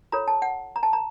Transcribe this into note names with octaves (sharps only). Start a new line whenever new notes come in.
F4 A4 C#5 A#5
A5
F#5
A#5
A5
A#5